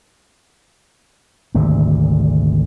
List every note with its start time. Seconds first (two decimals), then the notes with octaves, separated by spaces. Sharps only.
1.54 G#1 D2 C3